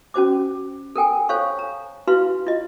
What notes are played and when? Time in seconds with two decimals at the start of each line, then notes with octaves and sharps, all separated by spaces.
0.14 C#4 F#4 C5 D6
0.96 A4 A#4 G5 G#5
1.29 A4 C5 C#5 F5 C#6
1.59 A#5
2.07 E4 F#4 B4 F5 C6
2.47 F4 D#5